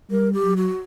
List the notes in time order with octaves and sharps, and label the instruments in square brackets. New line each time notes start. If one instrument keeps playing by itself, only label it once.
[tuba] G3 [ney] A#4
[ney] G4
[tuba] F#3
[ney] F#4